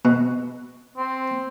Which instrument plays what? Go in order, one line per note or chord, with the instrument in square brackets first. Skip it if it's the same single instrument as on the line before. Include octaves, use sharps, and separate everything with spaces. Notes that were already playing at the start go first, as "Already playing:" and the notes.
[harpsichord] B2
[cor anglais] C4